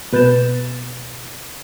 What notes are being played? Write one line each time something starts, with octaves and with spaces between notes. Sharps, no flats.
B2 B4 G6 A6 E7